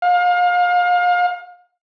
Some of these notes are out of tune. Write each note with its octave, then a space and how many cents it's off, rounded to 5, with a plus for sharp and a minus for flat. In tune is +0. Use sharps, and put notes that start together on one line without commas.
F5 +30